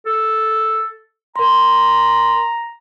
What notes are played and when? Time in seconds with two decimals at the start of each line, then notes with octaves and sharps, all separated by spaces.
0.06 A4
1.36 A#4 A#5 C6